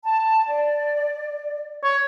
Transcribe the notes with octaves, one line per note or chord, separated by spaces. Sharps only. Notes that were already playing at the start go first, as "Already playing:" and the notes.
A5
D5
C#5